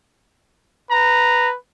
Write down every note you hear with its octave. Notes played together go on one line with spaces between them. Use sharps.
B4 A#5